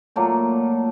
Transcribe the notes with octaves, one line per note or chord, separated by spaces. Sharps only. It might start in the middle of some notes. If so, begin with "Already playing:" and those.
A#2 F#3 A3 A#3